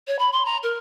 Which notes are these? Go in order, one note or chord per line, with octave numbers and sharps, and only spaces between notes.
C#5
B5
C6
A#5
A#4